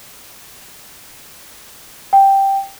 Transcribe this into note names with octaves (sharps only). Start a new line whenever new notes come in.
G5